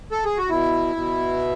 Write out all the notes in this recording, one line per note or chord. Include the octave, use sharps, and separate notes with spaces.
A4
G#4
F#4
B2 E4
B2